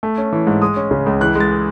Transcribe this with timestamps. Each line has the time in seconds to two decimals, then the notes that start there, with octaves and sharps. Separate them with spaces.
0.03 A3
0.18 C#4
0.33 E3
0.47 G#2
0.62 G#3 D#6
0.76 C#4
0.91 C#3
1.06 C#2
1.21 E3 F#6
1.35 G#3
1.40 A6